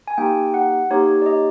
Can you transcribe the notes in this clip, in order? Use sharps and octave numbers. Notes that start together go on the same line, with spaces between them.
G#5
A#3 D#4 G4 G5
F#5
A#3 D#4 G4 C#5
D5
D#5